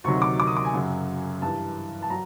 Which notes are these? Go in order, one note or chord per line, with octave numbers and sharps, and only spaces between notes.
D2 C3 D#3 F#3 C#6
D6
D6
D#6
D6
G#5
F#2 C#3 F#3
G2 E3 A5
A5
F#3 A#5